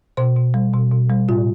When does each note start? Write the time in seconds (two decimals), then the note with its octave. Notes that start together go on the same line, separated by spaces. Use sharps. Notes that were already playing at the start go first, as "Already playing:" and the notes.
0.17 B2 C5
0.36 B2
0.54 G3
0.73 B2
0.92 B2
1.10 G3
1.28 A2 F4